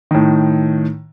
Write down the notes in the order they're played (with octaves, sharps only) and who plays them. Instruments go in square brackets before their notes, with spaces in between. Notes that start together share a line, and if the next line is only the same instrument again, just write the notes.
[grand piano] A2 D#3